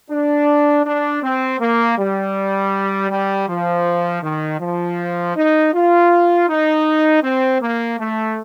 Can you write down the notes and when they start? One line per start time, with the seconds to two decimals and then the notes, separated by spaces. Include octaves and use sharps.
0.10 D4
0.85 D4
1.23 C4
1.60 A#3
1.98 G3
3.10 G3
3.48 F3
4.23 D#3
4.60 F3
5.36 D#4
5.74 F4
6.48 D#4
7.23 C4
7.61 A#3
7.99 A3